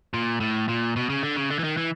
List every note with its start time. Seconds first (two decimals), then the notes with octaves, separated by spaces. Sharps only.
0.14 A#2
0.40 A2
0.69 A#2
0.96 B2
1.09 C#3
1.23 D3
1.36 C#3
1.50 D3
1.59 E3
1.64 D#3
1.77 E3